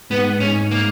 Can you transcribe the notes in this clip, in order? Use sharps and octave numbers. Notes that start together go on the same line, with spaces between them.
G#2 B3
G#2 C#4
A#3